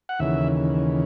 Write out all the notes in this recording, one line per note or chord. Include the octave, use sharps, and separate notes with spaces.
F#5
D#2 C#3 E3 E5